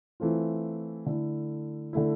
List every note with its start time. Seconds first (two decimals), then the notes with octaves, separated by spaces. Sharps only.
0.20 E3 A3 C4 F4
1.06 D3 A3 E4
1.93 D3 A3 E4